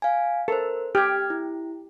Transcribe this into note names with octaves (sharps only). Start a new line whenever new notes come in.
F5 G#5
A4 A#4 C5
G4 F6 G#6
E4